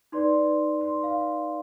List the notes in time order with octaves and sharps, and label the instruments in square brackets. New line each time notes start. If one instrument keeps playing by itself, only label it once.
[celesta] D#4 B4 D5 C6
C6
F5